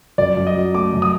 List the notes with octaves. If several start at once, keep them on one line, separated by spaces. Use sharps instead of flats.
F#2 D5
F#2
D#5
F#3
A3 D6
F#2
D#6